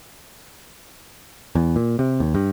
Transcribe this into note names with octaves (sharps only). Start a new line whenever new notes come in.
E2
A#2
C3
D#2
G2